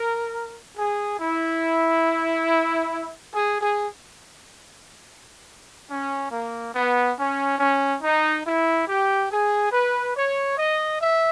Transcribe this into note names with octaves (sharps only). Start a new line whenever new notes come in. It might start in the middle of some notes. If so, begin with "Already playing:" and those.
Already playing: A#4
G#4
E4
G#4
G#4
C#4
A#3
B3
C#4
C#4
D#4
E4
G4
G#4
B4
C#5
D#5
E5